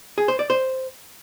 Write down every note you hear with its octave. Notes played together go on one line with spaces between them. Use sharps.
G#4
C5
D5
C5